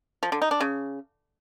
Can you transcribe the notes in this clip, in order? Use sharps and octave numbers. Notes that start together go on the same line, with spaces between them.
F3
D3
D#4
D4
C#3